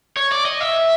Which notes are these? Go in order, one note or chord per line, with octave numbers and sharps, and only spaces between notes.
C#5
D5
D#5
E5